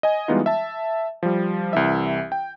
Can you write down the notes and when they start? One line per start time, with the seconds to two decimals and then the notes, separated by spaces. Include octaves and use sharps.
0.03 D#5 G#5
0.28 E3 G3 G#3 B3 D#4 F4
0.46 E5 A5
1.23 F3 G3
1.73 C2 E3 E5
2.32 G5